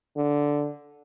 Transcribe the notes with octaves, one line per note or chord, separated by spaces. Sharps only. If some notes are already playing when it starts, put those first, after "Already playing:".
D3